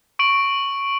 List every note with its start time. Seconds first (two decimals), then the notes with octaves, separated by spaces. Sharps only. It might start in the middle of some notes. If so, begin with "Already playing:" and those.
0.19 C#6 D7 F#7